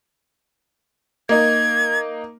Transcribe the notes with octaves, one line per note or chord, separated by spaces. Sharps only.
A#3 D#4 G#6